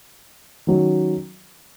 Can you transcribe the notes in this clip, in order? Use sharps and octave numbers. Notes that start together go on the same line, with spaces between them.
D#3 F#3 C#4